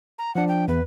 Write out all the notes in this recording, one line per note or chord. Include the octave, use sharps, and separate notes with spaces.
A#5
F3 D4 F#5
G5
E2 B4